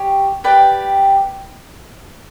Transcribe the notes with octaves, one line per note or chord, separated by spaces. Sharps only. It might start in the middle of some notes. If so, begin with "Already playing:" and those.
Already playing: G4 C#5
G4 B4 D5 G5